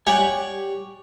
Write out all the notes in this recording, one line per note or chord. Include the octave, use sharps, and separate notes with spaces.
G4 C#5 D5 F#5 G#5